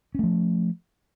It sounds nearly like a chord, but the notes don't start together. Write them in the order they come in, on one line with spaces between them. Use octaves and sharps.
C#4 A3 F3